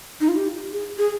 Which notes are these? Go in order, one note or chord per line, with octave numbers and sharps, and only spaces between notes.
D#4
F4
G4
G#4
G#4